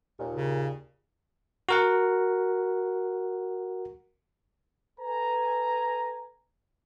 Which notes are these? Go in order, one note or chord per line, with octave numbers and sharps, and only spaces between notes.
D#2 A#2
C#3
F#4 A#4 F#5
A4 B4 G#5 A#5